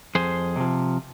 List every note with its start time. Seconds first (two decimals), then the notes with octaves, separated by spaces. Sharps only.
0.15 F2 G#4 C5
0.56 C3 F3